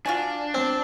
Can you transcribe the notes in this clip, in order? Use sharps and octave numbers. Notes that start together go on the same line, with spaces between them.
D4 F4 F#4 G#5
C4